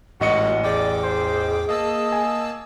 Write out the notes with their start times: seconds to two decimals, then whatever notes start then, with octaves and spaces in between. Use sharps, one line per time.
0.21 A1 G#2 G#3 A#3 F#4 D#5 F#5 C#7
0.63 E2 G#4 D5 G5 D6
1.03 C5
1.69 A#3 D#5 A5 E6
2.12 G#5